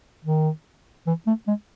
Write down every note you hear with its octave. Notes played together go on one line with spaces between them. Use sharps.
D#3
E3
A3
G#3